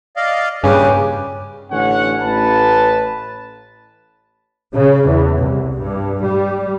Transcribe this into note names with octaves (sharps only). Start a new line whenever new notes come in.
D5 D#5 F5
G2 A#2 C#3 G4 B4 G#5 D6
A1 D3 C#4 C#5 F#5
A1 B4 A5
C#3
E2
C2
G2
G3